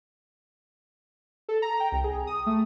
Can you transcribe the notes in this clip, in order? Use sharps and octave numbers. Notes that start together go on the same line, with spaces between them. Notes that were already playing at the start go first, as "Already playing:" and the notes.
A4
A#5
G5
C2
G#4
D#6
A3